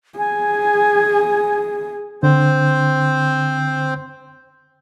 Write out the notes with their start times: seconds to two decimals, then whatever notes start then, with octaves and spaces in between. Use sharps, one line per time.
0.19 G#4 G#5
2.23 D3 C4 C5